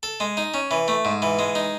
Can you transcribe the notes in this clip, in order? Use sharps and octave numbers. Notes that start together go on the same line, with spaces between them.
A4
G#3
D#4
C#4
E3
A3
G#2
E3
G#3
D#4